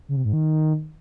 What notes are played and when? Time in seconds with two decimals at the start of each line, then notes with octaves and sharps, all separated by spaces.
0.09 C#3
0.17 C3
0.25 G#2
0.33 D#3